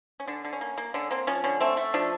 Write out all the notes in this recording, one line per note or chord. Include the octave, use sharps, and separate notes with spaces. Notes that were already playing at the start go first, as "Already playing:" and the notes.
C#4
D3 D4
D3
C#4
A#3
A#3
D3 C#4
A#3 C4
F3 C#4
D3 C#4
A3 C4
A3
F3 D4